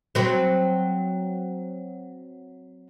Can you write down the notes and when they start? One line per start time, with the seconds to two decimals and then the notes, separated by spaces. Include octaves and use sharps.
0.15 F#3 C4